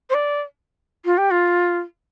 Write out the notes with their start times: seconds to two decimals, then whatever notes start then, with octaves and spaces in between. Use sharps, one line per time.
0.10 C5
0.14 D5
1.05 F4
1.18 G4
1.31 F4